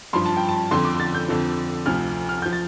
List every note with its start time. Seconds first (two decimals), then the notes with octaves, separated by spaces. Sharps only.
0.13 G2 F3 C6
0.26 A5
0.37 G5
0.49 A5
0.71 F2 D3 F3 C6
0.85 D6
1.00 A6
1.15 G6
1.28 F2 D3 F3
1.86 D2 C3 F3 F6
2.29 F6
2.42 F3 G6
2.53 A6